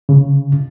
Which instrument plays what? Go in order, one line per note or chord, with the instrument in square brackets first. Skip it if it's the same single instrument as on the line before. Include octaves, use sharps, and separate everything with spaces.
[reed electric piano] C#3